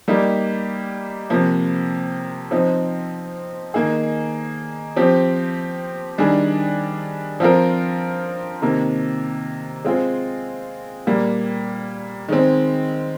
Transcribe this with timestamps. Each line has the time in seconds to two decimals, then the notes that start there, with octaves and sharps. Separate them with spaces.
0.08 G3 A#3 D#4 G4
1.30 C3 F3 A#3
2.51 F3 C4 D#4
3.74 D#3 A#3 D#4 G#4
4.96 F3 C4 G4
6.18 D#3 G3 D4 G#4
7.40 F3 C4 F4 A#4
8.62 C3 D#3 A#3
9.85 G#3 C4 F4 G#4
11.07 A#2 G3 A#3
12.28 D#3 G#3 C4